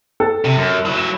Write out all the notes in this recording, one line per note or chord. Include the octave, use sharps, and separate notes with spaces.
A4
C3
F#2
F#3 E4
E7